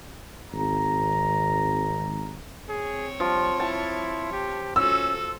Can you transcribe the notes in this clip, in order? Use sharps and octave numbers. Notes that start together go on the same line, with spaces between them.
G#1 A#5
C4 G#4 C#5
F3 G3
E4 A5
G4
C#4 F4 F#4 A4 E6